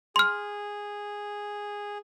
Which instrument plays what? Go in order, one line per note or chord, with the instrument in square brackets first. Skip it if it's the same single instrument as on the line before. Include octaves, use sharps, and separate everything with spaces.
[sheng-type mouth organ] G#4 [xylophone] C6 F6